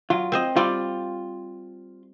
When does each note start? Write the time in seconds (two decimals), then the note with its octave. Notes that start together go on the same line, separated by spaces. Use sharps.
0.10 F#3 F4
0.32 C4 C5 D#5
0.57 G3 C4 F4 D5